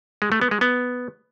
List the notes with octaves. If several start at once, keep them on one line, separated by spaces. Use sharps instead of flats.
G#3
A3
B3
G#3
B3